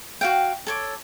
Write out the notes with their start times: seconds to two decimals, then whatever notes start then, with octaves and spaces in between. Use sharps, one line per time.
0.21 F#4 F5 G5
0.67 A4 C#5 D6